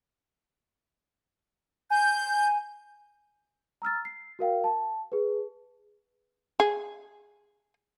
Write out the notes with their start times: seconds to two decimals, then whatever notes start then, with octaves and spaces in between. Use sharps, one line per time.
1.90 G#5 G6
3.82 A#5 E6 F6 A6
4.05 C7
4.39 F#4 A#4 F5 G5
4.64 A5
5.12 G#4 B4
6.60 G#4